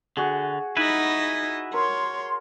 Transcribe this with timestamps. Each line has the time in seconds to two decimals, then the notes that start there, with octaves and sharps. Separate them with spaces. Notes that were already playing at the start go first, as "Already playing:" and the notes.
0.17 D3 F#4 G#4
0.77 D#4 E4 B4 D#5
1.74 A#4 C#5 C6